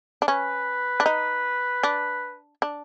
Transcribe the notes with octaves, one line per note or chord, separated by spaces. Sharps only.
D4
C#4 B4
D4
D#4
D4
D4